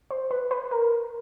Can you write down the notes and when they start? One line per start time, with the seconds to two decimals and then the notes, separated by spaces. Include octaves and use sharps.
0.11 C5
0.31 B4
0.51 B4
0.71 A#4